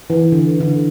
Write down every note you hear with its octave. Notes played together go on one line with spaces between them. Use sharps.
E3
D3
D3